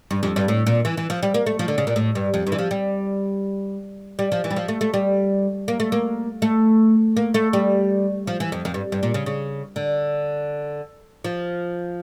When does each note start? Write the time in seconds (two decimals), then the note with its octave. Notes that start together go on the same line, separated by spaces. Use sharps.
0.11 G2
0.23 F2
0.36 G2
0.48 A2
0.66 A#2
0.85 E3
0.97 E3
1.10 F3
1.23 G3
1.34 A#3
1.46 A3
1.59 F3
1.68 D3
1.78 C#3
1.87 A#2
1.96 A2
2.15 G2
2.34 F2
2.47 G2
2.52 E3
2.58 F3
2.71 G3
4.19 G3
4.32 F3
4.44 E3
4.50 G3
4.56 F3
4.68 A3
4.81 A3
4.94 G3
5.68 A#3
5.80 A3
5.92 A#3
6.42 A3
7.17 A#3
7.34 A3
7.53 G3
8.27 F3
8.40 E3
8.52 F2
8.65 F2
8.74 G2
8.92 G2
9.03 A#2
9.14 C#3
9.26 C#3
9.76 D3
11.24 F3